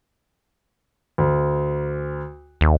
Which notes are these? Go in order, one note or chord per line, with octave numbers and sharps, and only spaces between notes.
D2
D#2